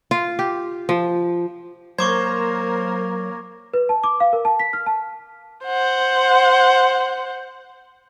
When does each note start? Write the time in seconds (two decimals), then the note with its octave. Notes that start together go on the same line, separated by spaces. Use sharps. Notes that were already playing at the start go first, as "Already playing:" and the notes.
0.11 F4
0.39 G4
0.89 F3
1.99 F#3 A#3 A#4 C5 C#6 D6 G#6
3.74 B4
3.89 A5
4.04 D6
4.20 F5
4.33 A#4
4.45 A5
4.60 B6
4.73 F6
4.86 A5
5.66 C5 F#5